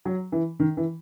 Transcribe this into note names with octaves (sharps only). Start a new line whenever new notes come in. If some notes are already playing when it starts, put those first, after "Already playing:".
F#3
E3
D#3
E3